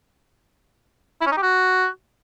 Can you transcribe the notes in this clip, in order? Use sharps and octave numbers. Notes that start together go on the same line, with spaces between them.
E4
C#4
D#4
G4
F#4